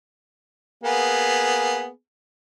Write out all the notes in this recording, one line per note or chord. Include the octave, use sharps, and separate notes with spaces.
A#3 B3 G#4